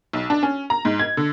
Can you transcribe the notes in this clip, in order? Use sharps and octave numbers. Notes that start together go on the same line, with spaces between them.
B1
D4
C#4
A#5
G#2
G#6
D3